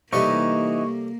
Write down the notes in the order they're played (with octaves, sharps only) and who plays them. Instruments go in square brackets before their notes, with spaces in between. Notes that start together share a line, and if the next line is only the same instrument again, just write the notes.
[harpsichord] C3 G3 A3 [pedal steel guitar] E3 D#4 D#5 [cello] A#3 [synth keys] C#6